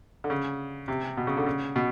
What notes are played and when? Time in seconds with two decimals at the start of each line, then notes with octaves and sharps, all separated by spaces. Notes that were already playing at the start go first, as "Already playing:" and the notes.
0.24 D3
0.30 C#3
0.88 C3
1.17 B2
1.27 C#3
1.37 D3
1.46 C#3
1.76 B2